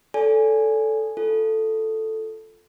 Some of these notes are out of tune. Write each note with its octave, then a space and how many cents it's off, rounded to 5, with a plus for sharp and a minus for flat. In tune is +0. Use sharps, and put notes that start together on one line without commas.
A4 -5 D5 -45 G#5 +0
F4 +0 A4 +0